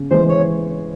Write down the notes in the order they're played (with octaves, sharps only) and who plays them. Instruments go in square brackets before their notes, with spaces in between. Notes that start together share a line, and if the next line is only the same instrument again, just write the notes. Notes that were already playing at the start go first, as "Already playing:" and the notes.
Already playing: [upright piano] C#3
[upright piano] E3 G#3 [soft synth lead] C5
[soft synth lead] C#5